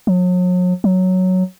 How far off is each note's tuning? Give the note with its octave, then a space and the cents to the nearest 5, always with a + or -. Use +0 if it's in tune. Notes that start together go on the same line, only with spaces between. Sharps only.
F#3 -40
F#3 +0